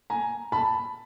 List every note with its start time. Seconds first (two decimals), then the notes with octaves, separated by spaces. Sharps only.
0.10 G#5 A#5
0.52 A5 B5